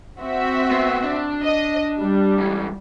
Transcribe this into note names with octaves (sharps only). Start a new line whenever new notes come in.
C4 F#4 E5
B3 C5
D4
D#5
G3
G#2 E3